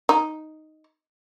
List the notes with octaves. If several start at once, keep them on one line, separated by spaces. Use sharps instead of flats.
D#4